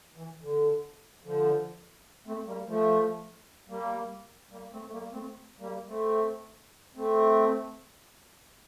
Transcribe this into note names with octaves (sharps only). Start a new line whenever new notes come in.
E3
D3
D3 F3
A3 C4
G3 A#3
F3 A3
G3 A#3
G3 A#3
A3 C4
A3
G3 A#3
A3 C4
G3 A#3
A3 C4
A3 C4